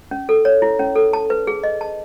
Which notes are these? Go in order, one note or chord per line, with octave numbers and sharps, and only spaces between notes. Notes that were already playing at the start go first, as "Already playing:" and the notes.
C#4
A4
C#5
E4
C#4
A4
A5
B4
G#4
D#5
A5